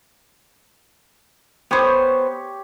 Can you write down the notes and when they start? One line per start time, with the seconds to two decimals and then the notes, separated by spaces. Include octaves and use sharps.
1.71 B3 G4 C5 C#5 C#6